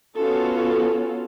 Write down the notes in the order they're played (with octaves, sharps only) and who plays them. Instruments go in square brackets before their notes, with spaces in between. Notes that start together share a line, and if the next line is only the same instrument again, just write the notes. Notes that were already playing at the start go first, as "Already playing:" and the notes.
[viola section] B3 C#4 F4 F#4 A4